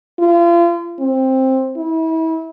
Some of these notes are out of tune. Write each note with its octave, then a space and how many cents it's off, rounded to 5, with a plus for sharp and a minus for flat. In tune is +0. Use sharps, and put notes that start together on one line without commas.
F4 -35
C4 +10
E4 -35